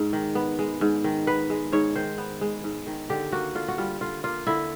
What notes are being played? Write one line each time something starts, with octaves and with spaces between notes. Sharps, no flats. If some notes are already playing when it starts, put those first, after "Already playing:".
Already playing: G#2 G#3
D#3
B3
G#3
G#2
D#3
B3 B4
G#3
G#2 C#5
D#3 C5
B3
G#3
G#2
D#3
D3 G4
A#3 F#4
D3 F4
F#4
G3 F4
D3 F4
A#3 F4
D3 E4